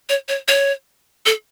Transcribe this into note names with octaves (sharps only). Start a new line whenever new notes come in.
C#5
C#5
C#5
A4